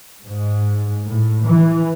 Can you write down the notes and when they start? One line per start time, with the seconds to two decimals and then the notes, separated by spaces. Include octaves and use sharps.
0.24 G#2
1.05 A2
1.44 E3